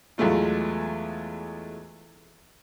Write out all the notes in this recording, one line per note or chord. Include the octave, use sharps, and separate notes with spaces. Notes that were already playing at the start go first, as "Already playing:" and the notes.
E2 F#3 G#3 A3 F4